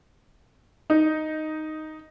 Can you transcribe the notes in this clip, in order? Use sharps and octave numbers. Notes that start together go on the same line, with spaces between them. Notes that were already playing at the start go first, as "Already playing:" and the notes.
D#4